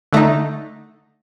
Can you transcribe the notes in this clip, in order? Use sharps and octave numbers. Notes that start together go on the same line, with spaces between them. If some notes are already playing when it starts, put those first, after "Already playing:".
D3 A3 D#4